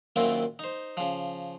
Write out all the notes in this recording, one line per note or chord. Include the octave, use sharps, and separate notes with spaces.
F#2 A#2 D#3 C4 E4 F4
D#4 C5
C#3 F3